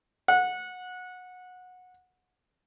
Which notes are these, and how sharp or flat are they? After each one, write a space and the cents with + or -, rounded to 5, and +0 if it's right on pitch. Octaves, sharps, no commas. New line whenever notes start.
F#5 -20